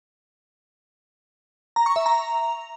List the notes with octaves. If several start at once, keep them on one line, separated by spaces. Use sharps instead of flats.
A#5
C#6
E5
A#5